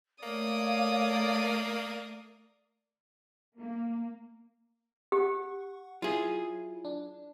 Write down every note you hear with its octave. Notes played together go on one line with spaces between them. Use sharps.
A3 A#3 C#5 D5 F5 D#6
A#3
G4 F#5 C#6
F#3 E4 F4 G#4
D4